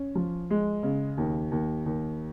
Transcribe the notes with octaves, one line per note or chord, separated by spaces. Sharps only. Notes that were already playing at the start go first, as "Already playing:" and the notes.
Already playing: C#4
F3
G#3
C#3
D#2
D#2
D#2